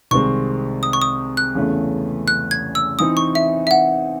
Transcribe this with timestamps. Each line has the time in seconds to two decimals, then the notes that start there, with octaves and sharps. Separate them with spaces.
0.11 C2 C3 D#3 G#3 C4 C#6
0.83 D#6
0.93 C#6
1.02 D#6
1.37 F#6
1.55 E2 C#3 E3 A3 C#4
2.28 F#6
2.51 G#6
2.75 E6
2.99 E3 C4 D#4 D#6
3.17 C#6
3.35 E5
3.67 E5
3.71 F#5